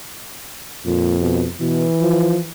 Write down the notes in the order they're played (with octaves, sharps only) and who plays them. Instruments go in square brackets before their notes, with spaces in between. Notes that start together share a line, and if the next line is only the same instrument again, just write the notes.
[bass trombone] F2 [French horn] A#2
[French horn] B2
[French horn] B2 [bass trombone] E3
[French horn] F3